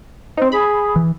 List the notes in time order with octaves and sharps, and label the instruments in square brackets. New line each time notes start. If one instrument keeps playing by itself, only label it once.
[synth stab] C4 D#4 [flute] C5
[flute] G#4 [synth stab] B5
[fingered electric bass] E3